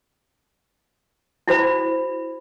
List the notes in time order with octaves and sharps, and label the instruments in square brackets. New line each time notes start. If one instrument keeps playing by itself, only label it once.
[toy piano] E4 F#4 C5 B5